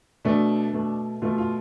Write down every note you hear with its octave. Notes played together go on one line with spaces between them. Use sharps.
B2 A3 D4
B2 A3
B2 A3 F4
F4